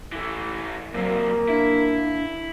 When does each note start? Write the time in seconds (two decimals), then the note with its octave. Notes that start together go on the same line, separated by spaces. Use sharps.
0.12 E3 A3
0.94 C2 F#3 A#3 C4
1.48 D4 E4